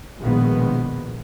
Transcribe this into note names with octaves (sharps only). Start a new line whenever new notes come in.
A#1 B2 D#3 G#3 B3